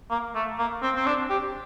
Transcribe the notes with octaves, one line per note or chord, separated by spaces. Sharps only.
A#3
A3
A#3
C4
C4
D4
G4